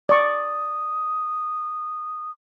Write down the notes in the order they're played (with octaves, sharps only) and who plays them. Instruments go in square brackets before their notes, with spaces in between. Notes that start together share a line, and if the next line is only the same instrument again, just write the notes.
[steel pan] D5 C#6 [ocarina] D#6